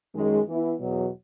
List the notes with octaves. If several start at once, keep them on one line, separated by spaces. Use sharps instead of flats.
F#2 D#3 G#3
E3 B3 E4
E2 B2 F#3